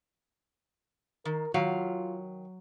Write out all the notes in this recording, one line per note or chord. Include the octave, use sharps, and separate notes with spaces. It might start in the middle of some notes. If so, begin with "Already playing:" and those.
D#3 A#4
D#3 F#3 F4 F5